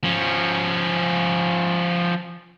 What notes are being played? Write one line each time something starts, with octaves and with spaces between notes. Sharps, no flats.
F3 C#4